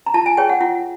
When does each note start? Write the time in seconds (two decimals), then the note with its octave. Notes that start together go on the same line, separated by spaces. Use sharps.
0.06 A#5
0.14 F4 A5
0.26 G#5
0.37 G#4 C#5 G5
0.49 F#5
0.61 F4 F#5